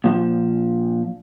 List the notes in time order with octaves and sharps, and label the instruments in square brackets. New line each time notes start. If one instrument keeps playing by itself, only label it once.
[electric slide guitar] A#2 F3